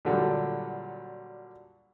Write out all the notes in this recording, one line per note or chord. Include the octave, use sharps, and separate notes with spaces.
A#2 D3 F#3 G3